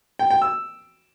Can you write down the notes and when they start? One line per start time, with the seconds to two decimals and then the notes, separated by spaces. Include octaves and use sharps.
0.19 G5
0.30 G5
0.42 E6